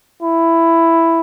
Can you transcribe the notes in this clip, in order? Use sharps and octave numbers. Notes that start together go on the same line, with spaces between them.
E4